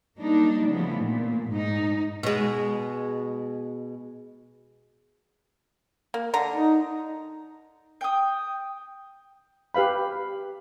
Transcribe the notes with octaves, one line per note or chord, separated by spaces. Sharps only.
F#3 G3 A#3 D4 D#4
C#3 E3 F3 A3 B3
A#2
G#2 D#4
B2 G#3
A#3
D3 A#5
D#4
G5 D#6
G4 B4 F5 B5